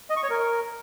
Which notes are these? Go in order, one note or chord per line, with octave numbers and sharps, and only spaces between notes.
D#5
C#6
C#5
A#4